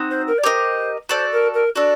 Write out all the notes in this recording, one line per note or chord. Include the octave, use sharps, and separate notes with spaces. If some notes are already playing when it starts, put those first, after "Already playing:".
Already playing: C4 D#4 F#4
C5
A#4
D5
G4 A#4 C5 D#5
F#4 A4 C5 D5
A#4
A#4
D4 F#4 A4 D5